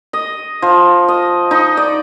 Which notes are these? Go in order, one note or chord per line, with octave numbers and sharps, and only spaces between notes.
D#5
F3
D#5
D#4
D5